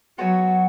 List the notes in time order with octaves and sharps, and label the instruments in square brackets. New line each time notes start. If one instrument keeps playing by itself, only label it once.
[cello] F#3 [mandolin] B3 F#4 C#5 G#5